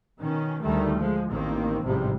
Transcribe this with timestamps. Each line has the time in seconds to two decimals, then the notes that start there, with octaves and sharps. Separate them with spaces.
0.20 B2 D#3 C#4
0.63 D2 D#3 G3 A3
0.98 F3 G#3
1.30 A1 D#3 A#3 C4
1.82 A1 G#2 C3 F3 G3